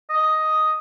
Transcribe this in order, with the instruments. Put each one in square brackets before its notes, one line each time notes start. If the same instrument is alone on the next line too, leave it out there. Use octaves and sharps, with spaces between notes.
[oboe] D#5